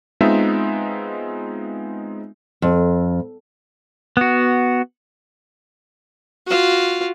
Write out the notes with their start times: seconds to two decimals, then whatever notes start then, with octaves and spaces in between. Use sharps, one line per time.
0.21 G#3 B3 C4 D#4 F4 E5
2.62 F2
4.17 B3 F#4
6.47 F4 F#4